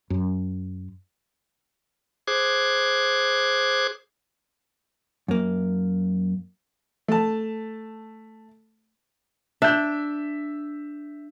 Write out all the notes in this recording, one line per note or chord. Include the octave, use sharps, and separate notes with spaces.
F#2
G#4 C5 D6 F#6 G#6
F#2 A#3
A3 A5
D4 E5 G6